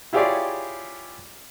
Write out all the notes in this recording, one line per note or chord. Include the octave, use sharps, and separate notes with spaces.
E4 F4 G4 G#4 C#5 D5